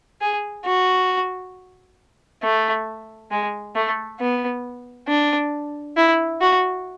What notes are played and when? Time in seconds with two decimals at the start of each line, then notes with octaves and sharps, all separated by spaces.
0.21 G#4
0.66 F#4
2.43 A3
3.31 G#3
3.75 A3
4.20 B3
5.08 D4
5.97 E4
6.41 F#4